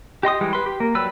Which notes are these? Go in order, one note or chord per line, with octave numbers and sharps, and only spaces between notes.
G4 D#5 C6 D#6
E3 G3 G#3
B4 C6
G4
A#3
F#3 G3 B4 E6